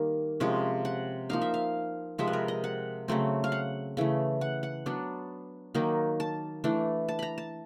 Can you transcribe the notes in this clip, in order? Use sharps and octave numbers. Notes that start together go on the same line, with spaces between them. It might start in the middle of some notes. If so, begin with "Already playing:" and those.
Already playing: D#3 G3 A#3
C3 F3 G#3 C#4
F#5
F3 A#3 D#4 F5
E5
F5
C3 F3 G#3 C4 E5
B4
A#4
D#5
F#5
C#3 F#3 A3 C4
F5
F#5
C#3 E3 A3
F#5
F#5
F#3 B3 D4
D#3 F#3 A#3 D#4
A5
E3 A3 D4
A5
A#5 B5
A5